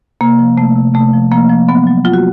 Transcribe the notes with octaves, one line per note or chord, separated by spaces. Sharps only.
C3 A#3
F3
C3 A3
C3
C3 A3
F3
F3 A#3
F3
F#3 B3
F#3
F#3 F4
F#4